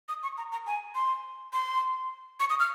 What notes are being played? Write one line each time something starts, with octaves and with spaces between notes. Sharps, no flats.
D#6
C#6
A#5
A#5
G#5
C6
C6
C#6
D#6
F6